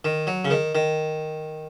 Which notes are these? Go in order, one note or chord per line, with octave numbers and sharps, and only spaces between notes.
D#3
F#3
C#3
D#3
D#3